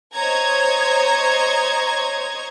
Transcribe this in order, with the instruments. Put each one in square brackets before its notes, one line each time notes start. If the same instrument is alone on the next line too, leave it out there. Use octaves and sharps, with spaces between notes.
[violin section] C5 C#5 D#5 A#5 G#6